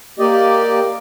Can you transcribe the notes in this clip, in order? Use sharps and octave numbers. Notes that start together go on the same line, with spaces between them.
A#3 G4 D5 D#5